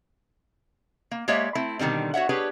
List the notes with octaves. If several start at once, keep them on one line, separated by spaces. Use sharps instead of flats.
A#3
G#3 A#3 G4 C#5 D5 E5
A3 C4 E4
B2 D3 D#3 G3 C4
F#4 C#5 E5 F#5
D4 G4 G#4 B4 C#5